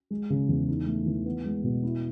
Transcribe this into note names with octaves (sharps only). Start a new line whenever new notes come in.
G#3
C#3
E2
D#4
A3
E3
B3
G#3
B2
E4